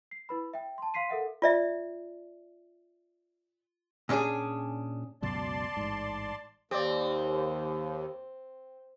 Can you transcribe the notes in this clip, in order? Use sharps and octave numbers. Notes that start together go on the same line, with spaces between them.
C7
E4 B4 B5
E5 G5
A5 C6
F5 C6 B6 C7 D#7
A4 A#4 E5 F#5
F4 D5 E5
A#2 C#4 D4 G4 G#4
C#2 F#2 B2 D5 A5 C6
A1 G#2
D#2 C4 G4 D5